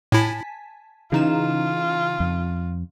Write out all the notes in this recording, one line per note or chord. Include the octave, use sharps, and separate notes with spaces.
A2 E4 G#5 A5 B6
C#3 E3 D#4 F4 E7
F2